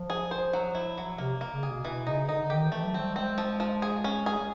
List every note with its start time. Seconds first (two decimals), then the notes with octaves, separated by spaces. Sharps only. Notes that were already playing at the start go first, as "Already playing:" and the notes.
Already playing: F3
0.10 G#4
0.31 C5
0.53 F#3
0.75 E4
0.98 F#3
1.18 C3 A#3
1.41 A#3
1.52 C#3
1.63 G#4
1.69 B2
1.85 B2 E3
2.07 C#3 D#4
2.29 D3 D#4
2.50 D#3 G4
2.67 E3 A3
2.83 F#3
2.94 C4
3.00 G3
3.16 G#3 C4
3.38 F3
3.60 F3
3.82 G#4
4.04 C#4
4.26 G#4
4.38 G#3